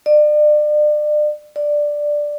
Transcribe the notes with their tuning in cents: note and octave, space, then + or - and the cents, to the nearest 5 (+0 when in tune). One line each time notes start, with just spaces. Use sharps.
D5 +35
D5 +5